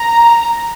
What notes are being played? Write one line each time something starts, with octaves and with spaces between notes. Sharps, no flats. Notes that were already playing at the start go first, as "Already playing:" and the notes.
Already playing: A#5